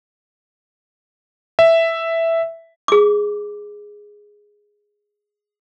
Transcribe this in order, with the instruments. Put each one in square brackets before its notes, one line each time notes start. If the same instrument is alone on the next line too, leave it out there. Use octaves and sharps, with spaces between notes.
[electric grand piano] E5
[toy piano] G#4 D6